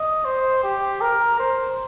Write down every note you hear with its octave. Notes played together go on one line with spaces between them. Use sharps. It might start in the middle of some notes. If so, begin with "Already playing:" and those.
Already playing: D#5
C5
G4
A#4
C5